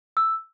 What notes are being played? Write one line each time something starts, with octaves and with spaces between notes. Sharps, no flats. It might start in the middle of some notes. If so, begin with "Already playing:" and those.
E6